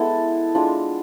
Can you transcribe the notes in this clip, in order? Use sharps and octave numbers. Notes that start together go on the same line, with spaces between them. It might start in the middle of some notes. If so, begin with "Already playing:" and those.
Already playing: G#3 B3 E4 A4 A5
G#3 D4 F4